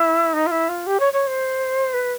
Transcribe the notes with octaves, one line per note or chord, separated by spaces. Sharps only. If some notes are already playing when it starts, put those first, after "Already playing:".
Already playing: E4
D#4
F4
E4
F4
G4
C#5
C#5
C5
B4